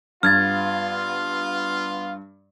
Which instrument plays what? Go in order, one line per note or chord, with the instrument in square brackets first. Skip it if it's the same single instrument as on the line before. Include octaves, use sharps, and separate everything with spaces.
[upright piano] G2 [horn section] B3 F4 [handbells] F6 G#6 A6